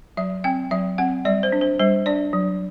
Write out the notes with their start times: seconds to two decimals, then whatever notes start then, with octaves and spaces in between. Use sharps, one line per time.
0.17 F#3 E5
0.44 C4 G5
0.71 F#3 E5
0.98 C4 F#5
1.25 G3 D5
1.43 C5
1.52 D4
1.61 C5
1.79 G3 C5
2.06 D4 D5
2.33 F#3